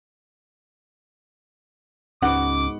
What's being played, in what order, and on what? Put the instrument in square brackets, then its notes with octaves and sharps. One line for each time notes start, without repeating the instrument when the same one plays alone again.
[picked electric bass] C#2 C#4 [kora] G#2 B3 F#4 [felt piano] F#5 [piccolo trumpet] D6